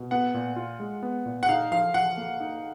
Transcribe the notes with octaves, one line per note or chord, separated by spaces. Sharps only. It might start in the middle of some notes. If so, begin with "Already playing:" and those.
Already playing: B2
B3 F#5
A#2
F4
G#3
B3
A#2
F#5
D#4 F5
F3 F5
F3 F#5
A#3
D#4